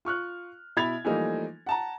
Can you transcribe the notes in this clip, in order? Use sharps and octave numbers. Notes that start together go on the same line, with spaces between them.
F4 C#6 F6 F#6
B2 E4 B5 G#6 A6 F7
E3 F3 G3 A3 A#3 D#4
F#5 A5 A#5